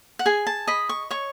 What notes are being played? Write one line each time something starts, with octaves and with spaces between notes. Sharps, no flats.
F#5
G#4 G#5
A5
D#5 B5
C#6
C#5 C#6